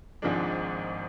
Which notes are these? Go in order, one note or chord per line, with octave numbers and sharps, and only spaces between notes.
G#1 G#2 F3 G#3 D4